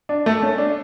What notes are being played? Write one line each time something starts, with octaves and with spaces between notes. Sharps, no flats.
D4
A3
C#4
D4